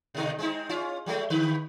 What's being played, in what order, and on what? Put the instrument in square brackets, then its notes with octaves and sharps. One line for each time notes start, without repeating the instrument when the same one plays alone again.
[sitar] B2 D3 D#4
G#3 C4 D#4
C#4 F4
F#3 G#3 A3
D3 B4